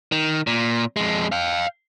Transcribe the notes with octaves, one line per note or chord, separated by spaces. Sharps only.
D#3
A#2
F2 G#3
F5 G5